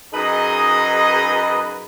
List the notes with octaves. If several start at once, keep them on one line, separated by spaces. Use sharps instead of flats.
F#2 D#4 G#4 B4 D#5